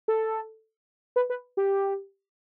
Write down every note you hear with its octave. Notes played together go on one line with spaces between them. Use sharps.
A4
B4
B4
G4